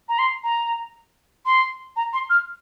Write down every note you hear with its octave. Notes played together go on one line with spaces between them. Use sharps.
A#5
C6
A#5
C6
A#5
C6
F6